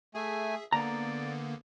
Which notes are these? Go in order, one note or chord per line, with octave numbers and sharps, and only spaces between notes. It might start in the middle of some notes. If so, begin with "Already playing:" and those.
A3 G#4 E5 G#5
D3 A#3 B3 D5 A#5